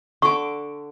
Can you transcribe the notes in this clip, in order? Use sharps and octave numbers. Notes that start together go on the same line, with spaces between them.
D3 C#6 D6